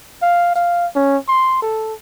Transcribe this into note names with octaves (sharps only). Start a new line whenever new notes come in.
F5
F5
C#4
C6
A4